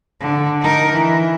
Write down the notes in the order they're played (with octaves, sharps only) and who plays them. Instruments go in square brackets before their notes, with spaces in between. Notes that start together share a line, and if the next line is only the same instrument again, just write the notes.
[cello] D3
D#4 A#4
E3